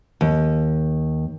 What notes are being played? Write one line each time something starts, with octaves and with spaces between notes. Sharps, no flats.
D#2